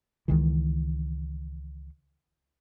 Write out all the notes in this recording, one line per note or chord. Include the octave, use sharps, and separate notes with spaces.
C#2 D#3 E3